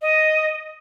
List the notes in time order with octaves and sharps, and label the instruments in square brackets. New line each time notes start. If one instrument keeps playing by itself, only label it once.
[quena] D#5